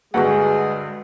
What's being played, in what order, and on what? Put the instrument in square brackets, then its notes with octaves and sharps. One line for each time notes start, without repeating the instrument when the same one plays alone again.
[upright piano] D2 G2 D3 [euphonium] G#3 [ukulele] F#4 B4 F#5 [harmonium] G#4